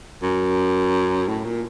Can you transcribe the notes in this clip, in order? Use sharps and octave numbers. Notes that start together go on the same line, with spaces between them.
F#2
A2
A#2